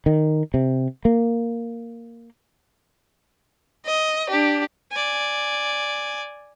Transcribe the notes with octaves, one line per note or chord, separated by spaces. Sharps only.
D#3
C3
A#3
D#5
D4 G4
D5 G#5